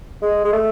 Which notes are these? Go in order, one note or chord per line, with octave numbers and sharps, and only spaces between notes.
G#3
G#3
A3